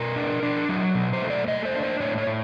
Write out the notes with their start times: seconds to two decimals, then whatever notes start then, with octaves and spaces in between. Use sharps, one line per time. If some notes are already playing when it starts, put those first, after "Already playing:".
Already playing: B2 A#4
0.16 D4
0.43 D4
0.69 F#3
0.95 B2
1.13 C5
1.21 A3
1.30 D5
1.48 A3 D#5
1.65 C5
1.74 D4
1.83 C5
2.00 A2 C#5
2.18 C#5
2.27 A2